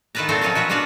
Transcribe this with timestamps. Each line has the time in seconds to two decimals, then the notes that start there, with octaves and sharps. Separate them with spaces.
0.15 D#3 E4 F4 B4 A5 A#5
0.29 A#2 A3 C4 A4 C5 A#5
0.42 B2 F3 F#3 C#4 F4 F5
0.55 E4 F#4 B4 C#5 F#5
0.69 B3 D4 F4 F#4 F5 F#5